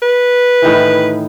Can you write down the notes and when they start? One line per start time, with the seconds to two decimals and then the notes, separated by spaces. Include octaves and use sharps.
0.02 B4
0.62 A2 D#3 E3